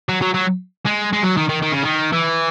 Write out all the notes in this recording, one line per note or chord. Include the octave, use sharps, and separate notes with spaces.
F#3
F#3
F#3
G#3
G#3
F#3
D#3
D#3
D#3
C#3
D#3
E3